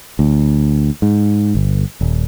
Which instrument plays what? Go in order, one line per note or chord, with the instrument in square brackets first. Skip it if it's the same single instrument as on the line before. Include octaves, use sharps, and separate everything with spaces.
[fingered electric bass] D2
G#2
G1
D#1